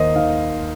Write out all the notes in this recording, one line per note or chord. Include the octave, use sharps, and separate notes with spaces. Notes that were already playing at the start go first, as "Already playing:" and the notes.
Already playing: D#2 A#3 C5 D#5
D#3 F5